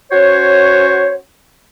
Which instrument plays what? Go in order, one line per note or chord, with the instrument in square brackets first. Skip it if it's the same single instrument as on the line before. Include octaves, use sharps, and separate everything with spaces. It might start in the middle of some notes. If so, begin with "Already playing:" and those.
[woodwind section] C#4 F#4 C5 C#5